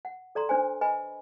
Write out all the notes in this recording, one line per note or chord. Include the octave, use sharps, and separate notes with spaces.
F#5
A4 D5 A#5 C6
D4 B4 C5 G#5
B4 D#5 G#5 B5